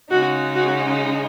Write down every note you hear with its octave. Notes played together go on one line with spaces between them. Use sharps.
C#3 G#3 D#4 F#4
F#4